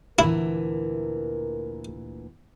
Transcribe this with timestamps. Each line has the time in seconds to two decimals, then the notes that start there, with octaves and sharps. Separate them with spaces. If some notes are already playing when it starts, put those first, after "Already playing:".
0.19 D2 A#2 E3 E4 A#4